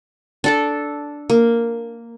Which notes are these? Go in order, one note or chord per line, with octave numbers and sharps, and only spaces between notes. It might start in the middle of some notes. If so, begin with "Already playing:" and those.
D4 A4 D5
A#3